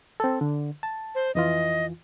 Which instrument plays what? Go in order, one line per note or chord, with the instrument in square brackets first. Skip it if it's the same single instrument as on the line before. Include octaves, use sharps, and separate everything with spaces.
[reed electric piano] C4 A4
D3
A5
[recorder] C5
[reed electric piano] F2 E3 F4 [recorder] D#5